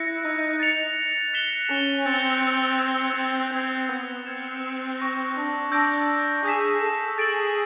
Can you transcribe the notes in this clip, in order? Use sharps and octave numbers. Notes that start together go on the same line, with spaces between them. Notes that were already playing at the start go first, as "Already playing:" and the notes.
Already playing: E4 F#6 A#6 C#7
D#4
A6 C#7 F7
F#6 B6 E7 G7
C#4
C4 A6 C#7 F7
G#6 C#7 E7 G7
C4
C4 E6 G#6 B6
B3
C4 F6 G#6 C#7 E7
C#6 F#6 A#6
D4
D4 E6 G6 A#6 D7
G#4 D#6 G6 B6 E7
A4
G#4 A6 D7 F#7